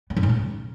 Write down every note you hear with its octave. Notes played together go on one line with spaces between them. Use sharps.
B3
F#2
A2
C#3